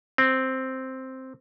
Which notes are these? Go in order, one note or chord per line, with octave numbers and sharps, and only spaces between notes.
C4